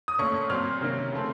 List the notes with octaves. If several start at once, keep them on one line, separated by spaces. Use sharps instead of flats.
D#6
A#2 A3 C#4 C#6
A#2 F#3 C4 F6
C3 D#3 A#3 C#4
C#3 F3 A3 C4